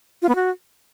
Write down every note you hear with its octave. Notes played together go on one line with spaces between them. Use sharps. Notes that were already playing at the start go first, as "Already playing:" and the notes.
F4
B3
F#4